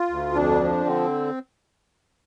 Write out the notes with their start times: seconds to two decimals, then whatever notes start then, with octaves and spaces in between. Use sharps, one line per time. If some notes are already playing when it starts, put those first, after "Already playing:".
Already playing: F4
0.10 D2
0.35 F2 D4
0.61 F3
0.85 D3 C4